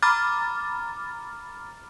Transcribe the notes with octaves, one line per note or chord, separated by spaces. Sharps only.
A#5 B5 D6 F6 A6